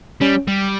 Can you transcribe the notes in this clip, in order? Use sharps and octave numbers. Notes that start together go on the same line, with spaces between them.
G3 C#4
G3